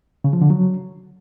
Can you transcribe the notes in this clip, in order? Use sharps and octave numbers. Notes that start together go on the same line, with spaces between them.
C#3
F3
D3
F#3